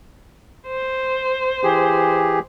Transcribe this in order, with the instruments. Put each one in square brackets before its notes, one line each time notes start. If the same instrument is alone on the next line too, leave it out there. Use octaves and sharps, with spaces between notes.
[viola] C5
[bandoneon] E3 G4 G#4